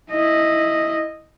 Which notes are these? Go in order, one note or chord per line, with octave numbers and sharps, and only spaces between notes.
E4 D#5